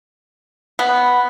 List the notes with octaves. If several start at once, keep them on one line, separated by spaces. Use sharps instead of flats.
B3